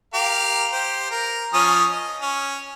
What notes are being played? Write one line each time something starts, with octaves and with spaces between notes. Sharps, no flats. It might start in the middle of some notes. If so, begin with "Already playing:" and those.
G4 A#4 F5
G4 C5
A#4
F3 C#4 D#6
D#5
C#4